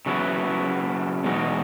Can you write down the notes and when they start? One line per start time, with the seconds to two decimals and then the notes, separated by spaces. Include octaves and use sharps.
0.06 C#3 F#3 B3 E4
1.24 E2 B2 G#3 D#4 F#4